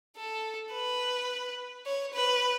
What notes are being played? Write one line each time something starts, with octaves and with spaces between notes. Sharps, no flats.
A4
B4
C#5
B4